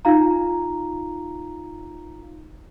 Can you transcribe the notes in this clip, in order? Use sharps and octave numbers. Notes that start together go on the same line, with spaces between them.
D#4 F4 F5 A#5